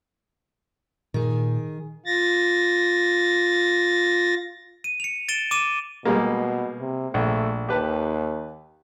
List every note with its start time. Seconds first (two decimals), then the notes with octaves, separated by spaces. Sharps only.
1.14 A#2 D#3 G#4
2.06 F4 A6 A#6
4.84 D#7
5.00 C#7 F7
5.29 A6 D7 E7 G7
5.51 D6 D#7 E7
6.05 B2 G3 G#3 A#3
6.80 C3
7.14 A#1 A3
7.69 D#2 G4 B4 A5